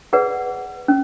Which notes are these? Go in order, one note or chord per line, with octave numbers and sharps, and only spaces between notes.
G#4 B4 D5 F#5
C#4